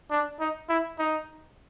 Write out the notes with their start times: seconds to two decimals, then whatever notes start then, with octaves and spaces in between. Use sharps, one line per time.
0.11 D4
0.40 D#4
0.69 E4
0.99 D#4